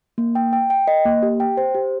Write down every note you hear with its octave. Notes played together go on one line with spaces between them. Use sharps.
A#3
G5
G5
G5
D#5
A#3
G4
G5
C5
G4